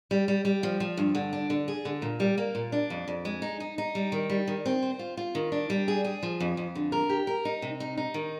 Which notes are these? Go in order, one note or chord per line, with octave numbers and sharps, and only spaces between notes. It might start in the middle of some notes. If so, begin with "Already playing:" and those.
G3
G3
G3
F3
F3
G2
D3
D4
D3
G#4
D3
A#2
G3
A#3
A#2
D4
F2
F2
G#3
D#4
D#4
D#4
G3
D#3
G3
D#3
C4
C5
F4
F4
D#3
D4
G3
G#4
G#4
F3
F2
F2
D3
A#4
G4
A#4
D#4
C3
D#4
D#4
D#3